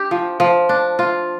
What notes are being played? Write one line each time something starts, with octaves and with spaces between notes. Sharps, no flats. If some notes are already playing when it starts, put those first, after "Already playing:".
Already playing: D4 G4
F3
F3
D4
F4